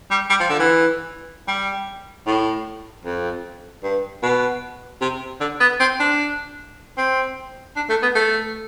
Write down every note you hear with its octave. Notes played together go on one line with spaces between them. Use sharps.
G3
G3
F3
D3
E3
G3
A2
F2
G2
B2
C3
D3
B3
C4
D4
C4
D4
A3
B3
A3